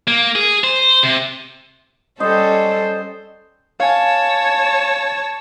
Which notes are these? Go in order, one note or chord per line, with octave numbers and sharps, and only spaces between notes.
A#3
G#4
C5
C3
G3 C#4 A4 C5 D#5
C#5 F5 G#5 A5